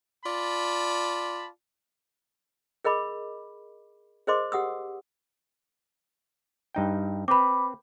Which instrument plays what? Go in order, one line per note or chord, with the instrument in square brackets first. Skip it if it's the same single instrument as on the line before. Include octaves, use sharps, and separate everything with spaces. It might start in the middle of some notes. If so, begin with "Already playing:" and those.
[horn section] F4 D5 A5 B5
[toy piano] G#4 A#4 D#5 B5 D6
G#4 A#4 C5 D#5 C6 D6
G4 F#5 D#6 E6
[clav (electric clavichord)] G2 D#4 G5
[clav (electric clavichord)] C4 B4 [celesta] B5 D6